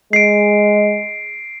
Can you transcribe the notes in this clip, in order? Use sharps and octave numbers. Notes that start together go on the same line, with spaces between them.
G#3 C7 D7